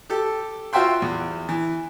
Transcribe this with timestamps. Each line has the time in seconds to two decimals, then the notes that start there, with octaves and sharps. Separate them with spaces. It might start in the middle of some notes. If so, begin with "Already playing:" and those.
0.10 G4 A4
0.73 F4 F#4 C5 E5 G5 C6
1.02 E2
1.49 E3